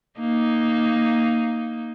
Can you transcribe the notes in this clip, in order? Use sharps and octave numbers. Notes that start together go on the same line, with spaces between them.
A#3 D#4